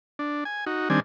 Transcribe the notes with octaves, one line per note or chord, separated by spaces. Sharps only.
D4
G#5
D#4 F#4
D#3 G3 C4 D4 G#5